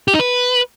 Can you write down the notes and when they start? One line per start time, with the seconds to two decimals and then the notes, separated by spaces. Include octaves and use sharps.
0.08 G4
0.14 D#4
0.20 B4